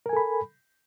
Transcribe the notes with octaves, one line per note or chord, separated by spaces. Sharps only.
A4 A#4 G#5 B5